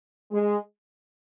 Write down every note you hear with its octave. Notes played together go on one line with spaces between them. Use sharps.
G#3